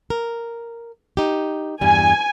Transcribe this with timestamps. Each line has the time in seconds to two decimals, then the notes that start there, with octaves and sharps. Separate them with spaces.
0.10 A#4
1.17 D#4 G4
1.81 E2 G2 G3 G#5